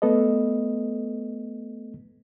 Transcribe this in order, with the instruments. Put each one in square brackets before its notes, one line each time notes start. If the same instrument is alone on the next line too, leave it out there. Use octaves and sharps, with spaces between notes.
[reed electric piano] A3 B3 A4 B4 D#5